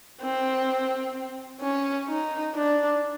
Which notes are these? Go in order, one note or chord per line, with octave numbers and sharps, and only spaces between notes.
C4
C#4
D#4
D4